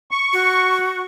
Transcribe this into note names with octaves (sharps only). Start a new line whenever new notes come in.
C#6
F#4